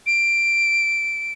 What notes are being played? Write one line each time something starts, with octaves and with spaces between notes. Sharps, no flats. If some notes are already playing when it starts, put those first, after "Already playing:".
D7